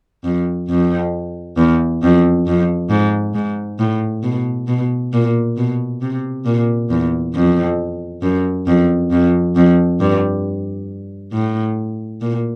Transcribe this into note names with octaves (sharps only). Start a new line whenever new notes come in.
F2
F2
E2
F2
F2
G#2
G#2
A2
B2
B2
A#2
B2
C3
A#2
E2
F2
F#2
F2
F2
F2
G2
A2
A#2